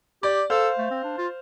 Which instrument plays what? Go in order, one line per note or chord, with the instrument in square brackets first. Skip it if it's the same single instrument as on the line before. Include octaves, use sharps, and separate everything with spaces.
[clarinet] G4 [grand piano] D5
[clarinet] A4 [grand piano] C5 F5
[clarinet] A3
C4
D4
F4